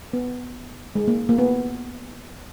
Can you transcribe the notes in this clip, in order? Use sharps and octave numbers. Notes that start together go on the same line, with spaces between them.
B3
G#3
A#3
A#3
B3